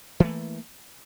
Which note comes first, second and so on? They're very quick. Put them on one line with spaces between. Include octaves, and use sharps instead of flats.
E3 A3 A#3